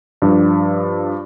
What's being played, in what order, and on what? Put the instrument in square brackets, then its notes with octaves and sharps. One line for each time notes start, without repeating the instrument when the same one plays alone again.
[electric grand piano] G2 F3 D4